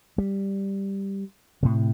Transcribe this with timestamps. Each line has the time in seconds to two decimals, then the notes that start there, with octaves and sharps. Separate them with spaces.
0.18 G3
1.63 A2 C3